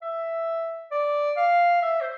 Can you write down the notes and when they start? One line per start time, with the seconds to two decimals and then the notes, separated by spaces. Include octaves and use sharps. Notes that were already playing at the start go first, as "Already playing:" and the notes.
0.02 E5
0.91 D5
1.37 F5
1.82 E5
2.01 C5